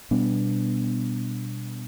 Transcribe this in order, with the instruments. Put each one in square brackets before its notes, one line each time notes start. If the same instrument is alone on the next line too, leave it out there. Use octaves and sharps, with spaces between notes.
[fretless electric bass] B2 G3 B3 D4